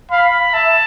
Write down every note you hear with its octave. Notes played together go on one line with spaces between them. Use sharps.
F5 B5
E5 A5